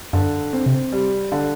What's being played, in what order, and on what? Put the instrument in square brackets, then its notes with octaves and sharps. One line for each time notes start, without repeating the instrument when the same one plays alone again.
[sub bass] F#2 [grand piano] D3
[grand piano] C4
[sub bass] C3
[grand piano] G3
D3